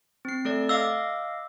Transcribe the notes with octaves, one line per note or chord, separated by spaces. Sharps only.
C4 C7
A3 A4 D5
D#5 F5 D6 E6